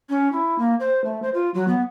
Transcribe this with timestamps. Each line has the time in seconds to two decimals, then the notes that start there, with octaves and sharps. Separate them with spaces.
0.09 C#4
0.32 E4
0.58 A#3
0.80 C5
1.04 A3
1.22 C5
1.34 F4
1.54 F#3
1.68 B3